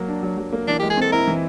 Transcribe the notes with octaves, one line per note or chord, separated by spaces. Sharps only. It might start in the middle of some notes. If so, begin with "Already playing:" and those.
Already playing: F#3 A#3
D4
F#3
F#3
A#3
E3 D4
G#3 G4
G#4
C4 A4
E4 A#4
E3